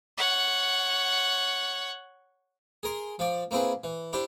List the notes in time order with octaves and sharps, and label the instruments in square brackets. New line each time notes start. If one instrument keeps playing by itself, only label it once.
[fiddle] C#5 F#5
[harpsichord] G#4 A#4 C6
F3 D5
A#3 C4 E4 G#4 B4
E3
D4 E4 G4 C5